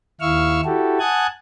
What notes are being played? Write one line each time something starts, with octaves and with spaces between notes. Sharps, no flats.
D#2 E4 F5 C#6 E6 F6
E4 F#4 G4 A4
F#5 G#5 A5 D#6 F#6 G#6